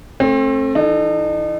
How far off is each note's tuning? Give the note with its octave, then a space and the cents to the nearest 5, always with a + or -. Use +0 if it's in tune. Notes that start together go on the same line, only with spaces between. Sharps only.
A3 +0 C4 +35 A4 +0
E3 +0 D#4 -40 A4 -10